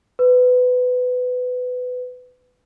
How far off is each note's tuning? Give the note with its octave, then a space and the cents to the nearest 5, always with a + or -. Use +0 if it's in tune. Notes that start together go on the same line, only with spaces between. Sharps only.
B4 +20